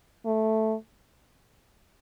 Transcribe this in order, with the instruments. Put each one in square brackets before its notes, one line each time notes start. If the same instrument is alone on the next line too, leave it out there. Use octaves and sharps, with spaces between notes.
[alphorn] A3